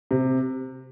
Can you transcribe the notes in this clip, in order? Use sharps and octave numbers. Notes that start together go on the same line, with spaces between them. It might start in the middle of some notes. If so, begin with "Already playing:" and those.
C3